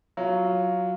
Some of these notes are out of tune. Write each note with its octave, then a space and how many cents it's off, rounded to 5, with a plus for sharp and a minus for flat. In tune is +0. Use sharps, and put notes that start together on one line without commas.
F#3 +0 F4 +0